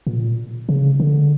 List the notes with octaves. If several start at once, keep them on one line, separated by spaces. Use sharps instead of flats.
A#2
C#3
D3